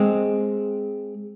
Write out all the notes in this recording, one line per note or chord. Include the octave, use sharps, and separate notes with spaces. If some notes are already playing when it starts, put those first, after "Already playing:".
Already playing: G#3 C4